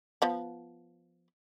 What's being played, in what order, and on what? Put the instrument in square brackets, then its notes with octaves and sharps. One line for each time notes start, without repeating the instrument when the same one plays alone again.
[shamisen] F3 B3